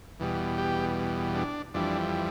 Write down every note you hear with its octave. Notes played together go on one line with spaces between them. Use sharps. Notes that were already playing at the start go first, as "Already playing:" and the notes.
E2 B2 G3
G4
D4
F2 E3 G3 D4